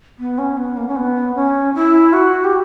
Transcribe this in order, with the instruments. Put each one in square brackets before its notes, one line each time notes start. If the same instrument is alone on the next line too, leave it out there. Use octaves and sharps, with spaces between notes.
[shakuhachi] B3
C#4
B3
A#3
C#4
B3
C#4
E4
F#4
G4